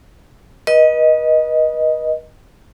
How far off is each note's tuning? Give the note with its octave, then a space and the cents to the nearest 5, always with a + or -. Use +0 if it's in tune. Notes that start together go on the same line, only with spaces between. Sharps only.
B4 -35 D#5 +0